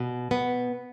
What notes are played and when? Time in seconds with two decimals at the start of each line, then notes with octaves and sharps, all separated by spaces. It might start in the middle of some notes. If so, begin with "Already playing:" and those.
Already playing: B2
0.31 B2 B3